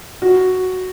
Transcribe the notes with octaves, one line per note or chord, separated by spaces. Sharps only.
F#4